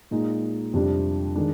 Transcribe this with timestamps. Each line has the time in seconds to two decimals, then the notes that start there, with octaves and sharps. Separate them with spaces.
0.11 A#2 G#3 D#4
0.73 F2 C3 G3 D4 F4
1.36 D#3 G#3 D4